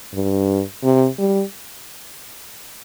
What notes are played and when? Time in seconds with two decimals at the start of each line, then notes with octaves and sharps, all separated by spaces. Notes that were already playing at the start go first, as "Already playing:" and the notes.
0.14 G2
0.83 C3
1.18 G3